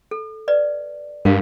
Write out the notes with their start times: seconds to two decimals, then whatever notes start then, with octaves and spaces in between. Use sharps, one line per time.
0.11 A4
0.48 B4 D5 D#5
1.25 G2 A#4 F5